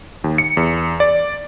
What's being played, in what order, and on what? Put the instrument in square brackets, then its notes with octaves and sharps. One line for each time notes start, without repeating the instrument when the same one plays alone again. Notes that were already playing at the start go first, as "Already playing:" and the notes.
[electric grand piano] D#2
C#7
E2
D5